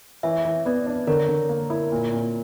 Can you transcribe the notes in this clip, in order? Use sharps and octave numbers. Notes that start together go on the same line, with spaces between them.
E3 C#5 E5
E3
B3 B4 D5
D4
D3 A#4 C#5
D3
A#3
E4
A#2
A#2